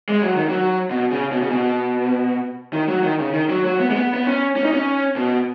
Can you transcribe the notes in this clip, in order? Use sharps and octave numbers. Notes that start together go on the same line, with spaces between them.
G#3
F#3
D#3
F#3
B2
C#3
B2
C#3
B2
D#3
F#3
D#3
C#3
D#3
F#3
F#3
B3
G#3
B3
B3
C#4
C#4
D#4
C#4
B2